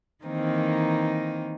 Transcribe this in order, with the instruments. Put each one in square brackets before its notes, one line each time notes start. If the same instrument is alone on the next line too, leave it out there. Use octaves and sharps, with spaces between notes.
[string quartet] D#3 E3 A#3 C4 D#4